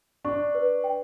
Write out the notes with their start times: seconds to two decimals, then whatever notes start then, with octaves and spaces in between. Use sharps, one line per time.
0.25 D4 C#6
0.55 B4
0.84 G5